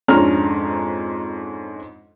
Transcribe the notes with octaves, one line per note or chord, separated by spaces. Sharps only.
F2 G#2 C#4 D4 A#5 F6